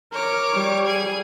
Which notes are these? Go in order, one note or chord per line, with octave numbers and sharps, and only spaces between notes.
A#4 C#5 D6
G3
G#4 G#6